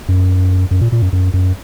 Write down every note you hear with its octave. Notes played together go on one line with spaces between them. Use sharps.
F#2
F#2
A#2
A#2
F#2
F#2
F#2